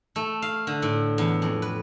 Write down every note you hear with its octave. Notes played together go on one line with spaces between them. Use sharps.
A3
F5
D3
A2
E2
F2
B4